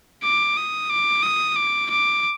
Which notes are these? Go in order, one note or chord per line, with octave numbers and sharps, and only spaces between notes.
D6
D#6
D6
D#6
D6
D6